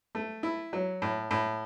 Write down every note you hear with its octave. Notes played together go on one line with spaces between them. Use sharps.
A3
E4
F#3
A2
A2